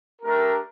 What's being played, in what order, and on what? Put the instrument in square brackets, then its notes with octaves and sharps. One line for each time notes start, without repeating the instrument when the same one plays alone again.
[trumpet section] A3 D4 G4 A#4